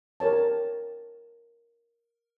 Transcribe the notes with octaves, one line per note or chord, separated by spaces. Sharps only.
G4 A#4 C#5 A5